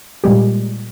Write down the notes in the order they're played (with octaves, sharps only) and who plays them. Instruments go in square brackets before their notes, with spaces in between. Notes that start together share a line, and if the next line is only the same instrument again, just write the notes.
[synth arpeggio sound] A#2 G3 G#3 G4